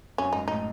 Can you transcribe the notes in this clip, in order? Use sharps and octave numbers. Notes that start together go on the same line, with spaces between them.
F#2 C#4
G#2 D#4
A2 D#4